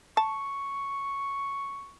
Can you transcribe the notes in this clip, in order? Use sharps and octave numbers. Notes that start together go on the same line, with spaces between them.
A5 C#6